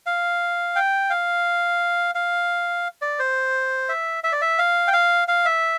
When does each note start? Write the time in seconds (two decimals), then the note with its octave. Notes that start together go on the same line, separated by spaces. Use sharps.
0.06 F5
0.76 G5
1.10 F5
2.15 F5
3.02 D5
3.19 C5
3.89 E5
4.24 E5
4.32 D5
4.42 E5
4.58 F5
4.88 G5
4.93 F5
5.28 F5
5.45 E5